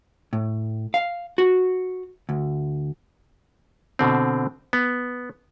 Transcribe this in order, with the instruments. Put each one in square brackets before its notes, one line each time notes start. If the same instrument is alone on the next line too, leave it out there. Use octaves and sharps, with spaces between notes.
[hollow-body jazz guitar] A2
F5
F#4
D2
[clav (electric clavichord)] B2 D3 C4
B3